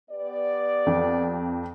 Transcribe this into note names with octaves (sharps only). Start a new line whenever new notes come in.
B3 G4 D5
F2